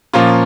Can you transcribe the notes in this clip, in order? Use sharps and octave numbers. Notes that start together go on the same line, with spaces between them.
A#2 F3 A#3 C#4 F4